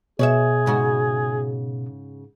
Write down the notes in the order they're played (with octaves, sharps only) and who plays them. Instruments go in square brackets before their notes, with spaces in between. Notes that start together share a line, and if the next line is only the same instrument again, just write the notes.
[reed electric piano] B2 [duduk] G#4 [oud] C#5 D5 E5
[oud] G#2 C#3 F#4